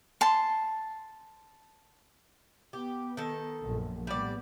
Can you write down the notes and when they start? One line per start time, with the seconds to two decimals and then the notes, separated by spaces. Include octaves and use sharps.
0.21 A5 C6
2.73 B3 G4
3.17 D#3 A4
3.61 A#1 F#2
4.07 A2 G3 B3 D5